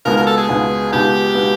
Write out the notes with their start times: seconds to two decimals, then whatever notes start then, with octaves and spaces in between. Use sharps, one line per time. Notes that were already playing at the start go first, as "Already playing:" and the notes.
0.05 C#2 B2 G#3 B3 A#4
0.17 A#4
0.27 A4
0.37 G#4
0.49 C#2 B2 G#3 B3
0.92 C#2 B2 G#3 B3 G4
1.35 B2 G#3 B3